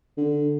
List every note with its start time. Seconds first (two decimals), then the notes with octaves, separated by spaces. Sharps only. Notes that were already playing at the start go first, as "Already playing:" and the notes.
0.17 D3